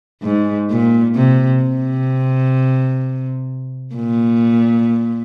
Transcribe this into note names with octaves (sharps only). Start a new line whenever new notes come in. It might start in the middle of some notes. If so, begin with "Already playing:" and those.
G#2
A#2
C3
C3
A#2